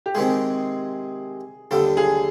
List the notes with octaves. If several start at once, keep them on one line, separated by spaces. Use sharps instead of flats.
G4
C3 D#3 G#3 G#4
D#2 D3 G3 A4
G#4